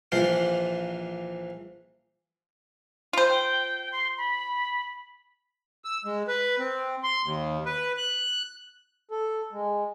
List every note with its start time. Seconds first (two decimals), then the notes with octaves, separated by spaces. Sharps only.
0.12 A#1 E3 F3 F4 C5 F5
3.13 F4 C5
3.29 G5
3.92 C6
4.18 B5
5.85 E6
6.05 G#3
6.28 B4
6.59 C4
7.04 C6
7.24 D#2
7.66 B4
7.97 F#6
9.11 A4
9.52 G#3